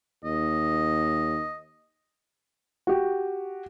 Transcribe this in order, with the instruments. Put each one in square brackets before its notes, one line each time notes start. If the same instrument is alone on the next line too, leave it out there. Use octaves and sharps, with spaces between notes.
[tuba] D#2 [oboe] D#5
[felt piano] F#4 G4